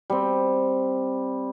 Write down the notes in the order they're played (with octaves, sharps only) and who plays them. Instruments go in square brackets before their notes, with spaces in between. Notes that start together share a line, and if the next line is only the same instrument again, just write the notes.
[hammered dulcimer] G3 C4